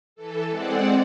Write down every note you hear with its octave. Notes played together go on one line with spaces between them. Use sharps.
E3 A4
G#3 C4 D5 F#5